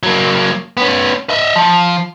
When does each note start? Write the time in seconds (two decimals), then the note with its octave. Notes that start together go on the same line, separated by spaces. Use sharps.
0.03 F#3 A#3
0.77 B3 C#4
1.30 D#5 E5
1.56 F3